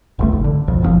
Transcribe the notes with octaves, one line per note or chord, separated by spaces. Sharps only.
F#1 C#2 A3
G#1
D3
B1 F2
G1 C#3 F3